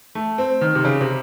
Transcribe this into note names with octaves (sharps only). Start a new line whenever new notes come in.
A3
C4
D#3
C3
C#3
C3